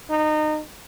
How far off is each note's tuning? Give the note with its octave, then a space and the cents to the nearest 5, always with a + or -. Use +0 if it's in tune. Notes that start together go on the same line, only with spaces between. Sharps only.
D#4 -25